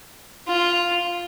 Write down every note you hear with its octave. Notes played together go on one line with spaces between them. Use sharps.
F4